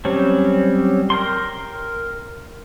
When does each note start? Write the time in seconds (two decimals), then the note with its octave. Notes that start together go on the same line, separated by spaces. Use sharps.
0.05 F#3 G3 C4 C#4
1.10 A#4 G5 C6